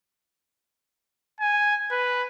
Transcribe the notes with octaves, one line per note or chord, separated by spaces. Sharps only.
G#5
B4